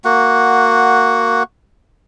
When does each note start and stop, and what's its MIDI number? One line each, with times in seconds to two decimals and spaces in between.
0.04 1.43 58
0.04 1.43 66
0.04 1.43 78